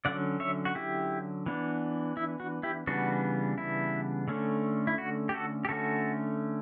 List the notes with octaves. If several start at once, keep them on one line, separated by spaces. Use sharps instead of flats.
D3 F#3 C#4 D5 F#5
C#5 E5
F#4
E4 G4
E3 B3 D4
E4
F#4
E4 G4
C#3 E3 G3 B3 D4 F#4
E4
D3 A3 C#4
E4
F#4
G4
F#4 A4
G4
D3 A3 C#4 F#4 A4